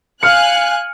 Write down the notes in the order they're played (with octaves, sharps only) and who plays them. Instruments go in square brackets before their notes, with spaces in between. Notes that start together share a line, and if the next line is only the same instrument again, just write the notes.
[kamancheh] F5 [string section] G#5 F#6 [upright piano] F6 C#7